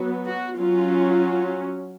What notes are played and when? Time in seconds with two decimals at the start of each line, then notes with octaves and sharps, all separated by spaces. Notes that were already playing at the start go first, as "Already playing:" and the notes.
Already playing: F#3 B3
0.27 F#4
0.59 F#3 C#4 F4